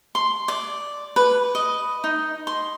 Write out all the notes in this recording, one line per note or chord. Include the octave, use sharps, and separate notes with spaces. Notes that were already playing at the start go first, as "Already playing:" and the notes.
C6
D5
B4
D#5
D#4
C6